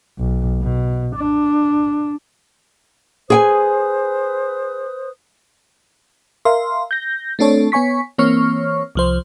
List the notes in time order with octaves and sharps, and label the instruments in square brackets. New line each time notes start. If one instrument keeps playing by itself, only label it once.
[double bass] B1
B2
D4
[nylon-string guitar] G#4 G5 G#5 [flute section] B4 C5 D#6
[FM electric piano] A#4 E5 F5 C6
G6 A#6
A3 C4 D4 A4 C#5
B3 C#5 G#5 C#6 B6
E3 A#3 C4 C#5 C#6 F6
C2 F3 C5